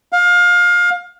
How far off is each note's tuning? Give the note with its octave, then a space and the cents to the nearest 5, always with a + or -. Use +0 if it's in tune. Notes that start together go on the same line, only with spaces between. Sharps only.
F5 +25